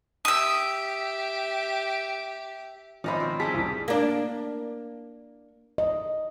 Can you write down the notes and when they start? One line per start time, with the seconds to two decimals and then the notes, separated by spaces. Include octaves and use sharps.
0.25 G4 E5 D#6 E6
3.04 G#1 F3 C#4 D#4 C5 D#5 E5 B5
3.20 B2 C4
3.40 G3 D#4 E4 G#4 A5 B6
3.54 C2 A2 C3
3.88 A#3 D4
5.78 D#5